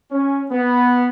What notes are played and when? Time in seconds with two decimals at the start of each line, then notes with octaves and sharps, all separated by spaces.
0.11 C#4
0.51 B3